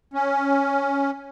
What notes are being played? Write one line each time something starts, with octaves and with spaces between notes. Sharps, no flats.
C#4